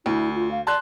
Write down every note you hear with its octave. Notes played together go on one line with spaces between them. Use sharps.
D2 E4
F4
F5
D5 A5 C6 F#6